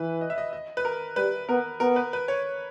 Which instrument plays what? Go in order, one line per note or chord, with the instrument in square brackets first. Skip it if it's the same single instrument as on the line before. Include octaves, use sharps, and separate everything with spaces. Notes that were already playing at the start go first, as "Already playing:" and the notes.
Already playing: [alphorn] E3 [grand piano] B4
[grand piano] D#5
E5
D#5
D#5
B4
A#4
[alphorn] G3 [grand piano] B4
[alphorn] B3 [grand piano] A#4
[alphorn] B3 [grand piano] A#4
[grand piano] B4
B4
C#5